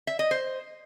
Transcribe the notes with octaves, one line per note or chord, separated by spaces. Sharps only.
E5
D#5
C5